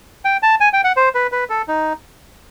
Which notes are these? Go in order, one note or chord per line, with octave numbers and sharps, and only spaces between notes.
G5
A5
G#5
G5
F#5
C5
B4
B4
A4
D#4